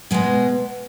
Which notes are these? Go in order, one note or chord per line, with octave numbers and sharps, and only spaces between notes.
B2 G#3 B3